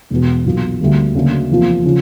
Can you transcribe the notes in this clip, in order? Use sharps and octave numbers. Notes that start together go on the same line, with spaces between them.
E1 E2 B2
B1 A#2 F#3 A#3
D2 D3 G3 A#3
D2 C#3 F#3 A#3 D4
E2 C3 F3 A#3
C#3 F3